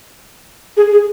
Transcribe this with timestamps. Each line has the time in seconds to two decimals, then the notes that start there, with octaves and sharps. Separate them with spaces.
0.77 G#4
0.92 G#4